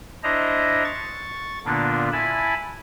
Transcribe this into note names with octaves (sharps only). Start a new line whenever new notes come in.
D4 E4 C5 D#5 A#5
C#6 A6
A#2 D3 A#3 B3 D4 F4
E4 G#5 A5 B5